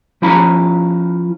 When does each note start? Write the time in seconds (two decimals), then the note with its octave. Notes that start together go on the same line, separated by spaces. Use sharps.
0.22 F3 C#4 E4 F4 A#5 B5